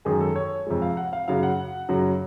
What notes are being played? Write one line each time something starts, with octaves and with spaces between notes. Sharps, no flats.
F#2 D#3 G#3 G#4
A4
C#5
F2 C3 F3 G#3
F5
F#5
F5
F#2 C#3 F#3 F5
F#5
F#2 C#3 F#3